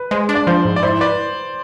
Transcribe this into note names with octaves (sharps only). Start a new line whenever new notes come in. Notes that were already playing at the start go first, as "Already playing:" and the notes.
Already playing: B4
G#3 C5
D4
D5
F3 C5
G#2
D5
E4 C5
B4 D5